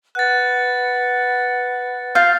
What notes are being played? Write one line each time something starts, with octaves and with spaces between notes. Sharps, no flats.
B4 F#5 F#6 A6
F4 F5 F6 G6 A6